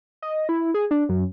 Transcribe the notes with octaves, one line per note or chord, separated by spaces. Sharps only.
D#5
E4
G#4
D4
F#2